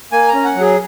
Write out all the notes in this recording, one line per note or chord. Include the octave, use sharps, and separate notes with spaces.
A#3 G#5
A#5
C#4
F#5
F#3
G#4